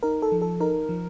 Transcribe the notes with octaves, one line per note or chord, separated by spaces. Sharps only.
D#4 A#4
A4
F3
A4
D#4 A#4
F3